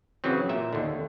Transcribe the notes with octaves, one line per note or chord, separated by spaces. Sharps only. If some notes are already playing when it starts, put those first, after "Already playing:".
C#3 E3 F#3 C4
A#2 E5
D#2 D3